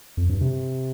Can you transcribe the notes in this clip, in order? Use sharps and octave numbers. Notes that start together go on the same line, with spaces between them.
F2
G2
C3